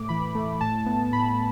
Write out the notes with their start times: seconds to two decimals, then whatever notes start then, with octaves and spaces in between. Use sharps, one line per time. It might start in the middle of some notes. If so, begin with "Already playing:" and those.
Already playing: A2 A3 D6
0.09 E3 B5
0.35 A3
0.61 A2 A5
0.86 B3
1.13 A2 B5